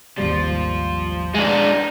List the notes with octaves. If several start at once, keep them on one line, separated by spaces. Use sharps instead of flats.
G#1 D#2 F3 G3 F4
G#3 D4 D#4